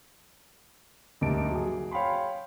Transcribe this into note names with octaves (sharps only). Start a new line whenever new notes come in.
D2 G2 A#3 D#4 A5 D7
F#3 G#4
C#5 F5 G5 B5 C6